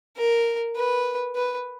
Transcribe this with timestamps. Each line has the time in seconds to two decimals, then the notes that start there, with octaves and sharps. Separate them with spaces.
0.17 A#4
0.76 B4
1.36 B4